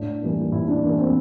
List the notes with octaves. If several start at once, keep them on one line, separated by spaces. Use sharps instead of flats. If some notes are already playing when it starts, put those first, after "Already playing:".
Already playing: A2 D4
E3 G3 A#3
A2 E4
D4
E3 G3 A#3 D4
C4